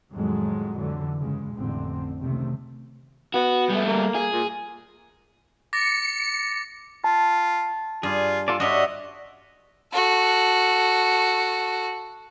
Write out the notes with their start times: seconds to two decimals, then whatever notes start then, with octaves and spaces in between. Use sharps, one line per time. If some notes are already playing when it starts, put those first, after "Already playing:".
0.11 F2 A2 D#3 F#3 G#3
0.76 F2 D3 E3 F#3
1.21 G2 C#3 G#3
1.55 A1 F2 A2 D3 C4
2.20 C#2 C3 D#3 A3 C4
3.34 B3 F#4
3.70 G3 A3
3.87 A#3
4.15 G#4
4.32 A#2
5.73 D6 A6 A#6 C#7
7.04 F4 A5
8.03 G2 F4 G#4
8.48 F4 A4 D5
8.60 G2 D4 F#4 C#5 D#5 E5
9.93 F#4 A4